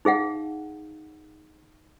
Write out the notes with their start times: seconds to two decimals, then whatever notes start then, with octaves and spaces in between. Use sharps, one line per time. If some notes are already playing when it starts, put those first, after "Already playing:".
0.05 D#4 G#4 F5 F#5